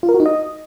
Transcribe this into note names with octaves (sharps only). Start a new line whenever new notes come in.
F4
A#4
F#4
D#4
D#5